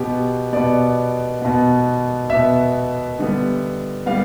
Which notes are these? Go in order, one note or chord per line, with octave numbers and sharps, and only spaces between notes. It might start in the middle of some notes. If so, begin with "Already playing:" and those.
Already playing: B2 B3 G4
B2 B3 D5
B2 B3
B2 B3 E5
D3 G3 B3
G3 B3 F5